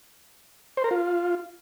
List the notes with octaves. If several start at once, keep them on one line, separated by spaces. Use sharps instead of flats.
C5
A#4
F4